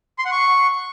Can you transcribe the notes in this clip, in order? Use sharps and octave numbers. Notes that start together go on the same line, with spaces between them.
C6
F#5
C#6